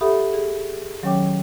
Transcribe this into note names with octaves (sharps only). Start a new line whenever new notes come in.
G4 A4 E5 F#5 B5 D#6
G#4
D#3 F#3 C#4 C#5 G5 D6